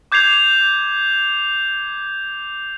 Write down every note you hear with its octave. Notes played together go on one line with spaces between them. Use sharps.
D6 G6 G#6 C7 F7